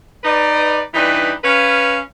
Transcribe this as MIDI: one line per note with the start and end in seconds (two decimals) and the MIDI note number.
0.24 0.81 63
0.24 0.81 71
0.24 0.81 74
0.94 1.32 43
0.94 1.32 52
0.94 1.32 62
0.94 1.32 63
0.94 1.32 67
0.94 1.32 71
1.44 1.98 61
1.44 1.98 71
1.44 1.98 77